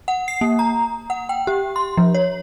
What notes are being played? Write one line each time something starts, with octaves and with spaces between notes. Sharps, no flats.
F#5
C7
A#3
A#5
F#5
G5
G4
C6
F3
C#5